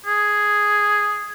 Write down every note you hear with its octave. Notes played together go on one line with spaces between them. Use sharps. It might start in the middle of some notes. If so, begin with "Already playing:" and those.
G#4